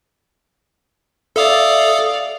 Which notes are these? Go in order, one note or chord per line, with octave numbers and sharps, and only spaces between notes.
A4 D5 E5 F5 D#6